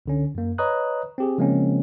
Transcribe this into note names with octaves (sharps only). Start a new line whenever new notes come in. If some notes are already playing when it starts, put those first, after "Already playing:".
C#2 D3 C#4
F#2 A#3
B4 C#5 D#5 A#5 D#6 F#6
C4 G4 G#4
C#3 F3 G#3 A#3 C4 C#4